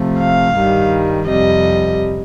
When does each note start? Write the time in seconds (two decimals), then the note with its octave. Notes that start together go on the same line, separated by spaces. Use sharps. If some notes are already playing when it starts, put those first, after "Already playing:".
Already playing: C3 F3 A3
0.19 F5
0.55 G2 D#3 G3
1.27 F2 C3 G3 D#5